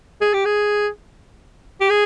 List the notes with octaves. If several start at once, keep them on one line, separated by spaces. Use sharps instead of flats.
G#4
G4
G#4
G4
G#4